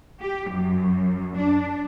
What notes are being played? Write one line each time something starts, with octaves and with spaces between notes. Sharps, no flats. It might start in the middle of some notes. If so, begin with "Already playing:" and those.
G4
F#2
D4